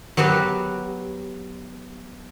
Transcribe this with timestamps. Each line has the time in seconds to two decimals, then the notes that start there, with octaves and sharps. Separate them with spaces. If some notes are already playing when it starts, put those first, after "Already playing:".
0.17 F#3 B3 F#4 G4